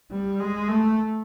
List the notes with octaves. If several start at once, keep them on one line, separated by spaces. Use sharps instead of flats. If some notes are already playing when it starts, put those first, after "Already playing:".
G3
G#3
A3